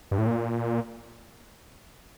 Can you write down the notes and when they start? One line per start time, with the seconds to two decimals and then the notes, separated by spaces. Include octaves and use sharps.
0.11 G2
0.18 A2
0.26 A#2